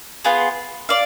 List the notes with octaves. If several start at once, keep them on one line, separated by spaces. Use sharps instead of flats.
B3 F4 G#4
D5 F5